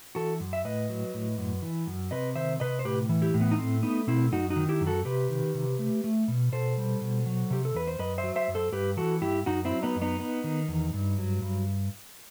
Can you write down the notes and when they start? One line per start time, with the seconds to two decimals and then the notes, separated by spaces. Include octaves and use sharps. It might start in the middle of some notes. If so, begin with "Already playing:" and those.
0.15 E3 F#4 A4
0.40 F#2
0.53 E5
0.65 A2 B4 D#5
0.89 F#3
1.14 A2
1.38 F#2
1.62 E3
1.87 F#2
2.11 C3 B4 D#5
2.35 D#3 C5 E5
2.60 C3 B4 D#5
2.79 C5
2.85 A2 G4 B4
3.09 E3
3.22 E4 G4
3.34 A2
3.41 B3
3.51 D#4
3.58 A3 C4
3.83 A3 B3 D#4
4.07 B2 C4 E4
4.32 F#2 D#4 F#4
4.50 D#4 F#4
4.56 D#3
4.69 E4 G4
4.81 F#2
4.87 F#4 A4
5.05 C3 G4 B4
5.30 D#3
5.54 C3
5.79 A3
6.04 A3
6.28 B2
6.52 B2 A4 C5
6.77 G3
7.01 B2
7.26 F#3
7.50 C3 G4
7.65 A4
7.74 E2 B4
7.88 C5
7.99 F#2 B4 D#5
8.18 C5 E5
8.23 F#3
8.36 C5 E5
8.48 F#2
8.55 A4 C5
8.72 G2 G4 B4
8.97 E3 F#4 A4
9.22 G2 E4 G4
9.46 F#2 D#4 F#4
9.65 C4 E4
9.71 F#3
9.83 B3 D#4
9.96 F#2
10.02 B3 D#4
10.20 B3
10.44 D#3
10.68 E2
10.94 G2
11.18 F#3
11.42 G2